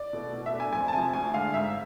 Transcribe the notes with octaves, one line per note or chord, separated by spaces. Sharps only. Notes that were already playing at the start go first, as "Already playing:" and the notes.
Already playing: D5
B2 A3
B2
E5
A3 D4
G#5
F2 G#5
A5
C3 F3 G#5
D2 G#5
D3 G#3 F5
G#2 E5